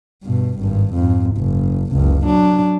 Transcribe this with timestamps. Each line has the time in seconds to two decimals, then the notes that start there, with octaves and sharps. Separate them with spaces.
0.23 G2 B2
0.59 G#1 G2
0.94 F2 G#2
1.37 F#1
1.92 F#1 C#2
2.26 F#3 D4